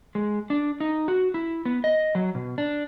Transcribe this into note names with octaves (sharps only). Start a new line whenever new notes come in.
G#3
D4
D#4
F#4
E4
B3
D#5
F#3
B2
D4